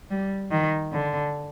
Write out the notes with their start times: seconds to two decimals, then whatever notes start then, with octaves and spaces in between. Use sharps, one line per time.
0.10 G3
0.51 D#3
0.93 D3